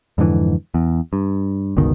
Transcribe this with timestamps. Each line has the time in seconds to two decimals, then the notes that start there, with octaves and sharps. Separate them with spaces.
0.18 F2 G#2 D3 E3
0.74 E2
1.13 G2
1.77 G1 C#2 B2 D#3